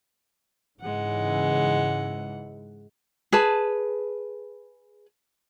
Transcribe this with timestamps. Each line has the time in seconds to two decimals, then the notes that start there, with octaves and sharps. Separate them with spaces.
0.80 G#2 C#3 E3 G#3 F#5
3.33 G#4 B4 A5